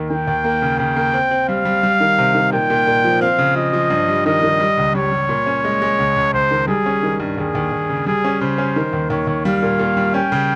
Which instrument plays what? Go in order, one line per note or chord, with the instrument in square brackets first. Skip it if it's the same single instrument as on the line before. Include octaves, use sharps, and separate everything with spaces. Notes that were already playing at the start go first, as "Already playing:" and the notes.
Already playing: [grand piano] D#2 D#3
[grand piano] D#3 [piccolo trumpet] G5
[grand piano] D#2
A#3
C#3
[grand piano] C#3 [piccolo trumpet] G5
[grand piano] A#3
C4
C4
[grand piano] G3 [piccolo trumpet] F5
[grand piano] G3
G3
D#3
C3
D#3
[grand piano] A#2 [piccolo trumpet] G5
[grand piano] A#2
A#2
F3
[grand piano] C4 [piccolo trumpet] F5
[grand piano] C#3
[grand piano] F3 [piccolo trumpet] D#5
[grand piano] F3
G2
G3
[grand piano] D#3 [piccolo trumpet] D#5
[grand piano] D#3
G3
C#2
[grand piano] G3 [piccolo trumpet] C#5
[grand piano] G3
A#2
C#4
G#3
G#3
C#2
C#2
[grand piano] C#2 [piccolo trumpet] C5
[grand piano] D#3
[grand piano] G3 [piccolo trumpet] G#4
[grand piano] C#4
D#3
G2
[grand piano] D#2 [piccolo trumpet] G#4
[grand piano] D#2
D#2
C#3
[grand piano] G3 [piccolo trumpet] G#4
[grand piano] C#4
[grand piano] C#3 [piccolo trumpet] C5
[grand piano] C#4
D#3
D#2
[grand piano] D#2 [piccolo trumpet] C#5
[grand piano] D#2
[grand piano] G3 [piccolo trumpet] F5
[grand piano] A#2
A#2
G3
[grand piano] C#4 [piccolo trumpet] G5
[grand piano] C#3